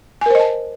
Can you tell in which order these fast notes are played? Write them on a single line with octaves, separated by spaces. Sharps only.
G#5 A#4 C5 D#5 A5